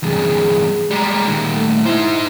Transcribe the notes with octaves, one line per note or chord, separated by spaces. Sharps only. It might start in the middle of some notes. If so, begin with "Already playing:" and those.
E2 G2 G#4
G3 G#3 A#5
A#2 D#3
A3
D#4 E4 C5